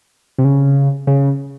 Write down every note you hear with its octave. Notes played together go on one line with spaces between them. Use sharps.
C3
C#3
C#3